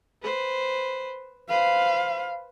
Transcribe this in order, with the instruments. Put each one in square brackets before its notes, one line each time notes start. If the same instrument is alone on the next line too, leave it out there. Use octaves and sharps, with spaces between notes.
[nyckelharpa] B4 C5
[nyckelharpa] B4 C5 [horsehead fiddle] F5